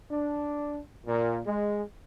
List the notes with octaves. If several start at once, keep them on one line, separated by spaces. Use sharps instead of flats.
D4
A#2
G#3